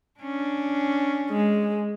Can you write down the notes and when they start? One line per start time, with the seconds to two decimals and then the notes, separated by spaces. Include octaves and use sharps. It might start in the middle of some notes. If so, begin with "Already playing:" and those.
0.20 C#4 D4
1.31 G#3